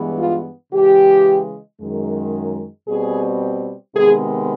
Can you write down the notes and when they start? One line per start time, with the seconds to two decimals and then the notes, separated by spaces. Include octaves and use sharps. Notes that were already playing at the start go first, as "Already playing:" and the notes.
Already playing: G2 E3 G#3 B3
0.18 F4
0.73 C#3 E3 G#3 G4
1.80 F#2 D#3 G#3
2.88 B2 G3 C4 G#4
3.95 C3 D#3 G#3 B3 G#4